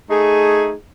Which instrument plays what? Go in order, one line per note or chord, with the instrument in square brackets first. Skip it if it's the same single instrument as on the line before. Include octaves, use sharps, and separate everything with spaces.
[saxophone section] A3 D#4 G#4